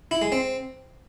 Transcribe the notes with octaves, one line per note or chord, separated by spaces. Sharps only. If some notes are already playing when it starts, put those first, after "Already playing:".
E4
G#3
C4